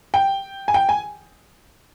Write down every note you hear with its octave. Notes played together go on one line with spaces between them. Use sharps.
G5
G#5
G5
G#5